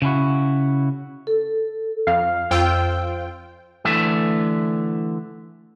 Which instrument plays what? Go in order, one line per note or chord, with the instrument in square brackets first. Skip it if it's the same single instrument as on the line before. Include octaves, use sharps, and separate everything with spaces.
[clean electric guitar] C#3 C#4 E4 F#4
[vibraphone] A4
[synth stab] F2 [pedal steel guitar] F5
[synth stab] F2 F4 G5 [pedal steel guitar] C5 E6
[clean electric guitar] D3 E3 A3 E5